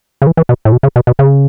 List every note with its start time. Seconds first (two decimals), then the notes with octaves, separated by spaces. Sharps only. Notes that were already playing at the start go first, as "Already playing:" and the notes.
0.22 C#3
0.27 E3
0.37 E3
0.49 B2
0.65 A2
0.72 B2
0.83 C#3
0.96 B2
1.07 B2
1.19 C#3